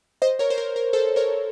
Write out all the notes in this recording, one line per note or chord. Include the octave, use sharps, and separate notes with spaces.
C5 D#5
A#4 C#5
C5
A#4
A#4
A4 C5
A#4 C#5